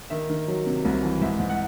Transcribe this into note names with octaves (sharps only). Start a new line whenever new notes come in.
D#3 E5
D#3
F#3
C3
C2
E3
G#2 E5
G#2
F#5